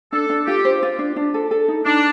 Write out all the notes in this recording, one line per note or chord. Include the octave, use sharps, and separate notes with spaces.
D4 A4
D4
F4 G4
C5
F4
D4
D4
A4
A4
D#4
D4 D#4